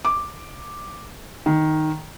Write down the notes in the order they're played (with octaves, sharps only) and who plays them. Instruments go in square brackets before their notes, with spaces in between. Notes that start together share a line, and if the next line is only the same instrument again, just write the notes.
[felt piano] D6
D#3